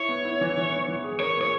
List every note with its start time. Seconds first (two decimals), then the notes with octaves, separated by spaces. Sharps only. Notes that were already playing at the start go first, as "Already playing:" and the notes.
Already playing: E4 C#5
0.09 B3
0.25 E4
0.41 E3
0.57 E3
0.72 B3
0.88 E3
1.04 G#4
1.20 A#4 C#5
1.37 A#2 C#5